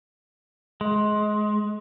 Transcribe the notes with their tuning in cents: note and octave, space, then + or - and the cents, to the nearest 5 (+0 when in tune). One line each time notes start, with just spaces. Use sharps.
G#3 +25